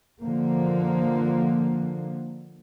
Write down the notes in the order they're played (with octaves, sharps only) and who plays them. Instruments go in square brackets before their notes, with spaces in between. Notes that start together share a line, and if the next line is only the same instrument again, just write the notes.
[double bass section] D3 F3 A#3